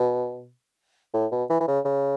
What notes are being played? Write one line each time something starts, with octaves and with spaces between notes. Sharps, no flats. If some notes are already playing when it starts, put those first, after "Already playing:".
Already playing: B2
A2
B2
E3
E3
C#3
C#3